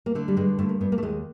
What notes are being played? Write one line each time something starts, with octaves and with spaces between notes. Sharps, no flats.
A#3
D3 A3
G3
G2 G#3
G2 A3
A#3
G2 B3
A#3
A3
D#2 G#3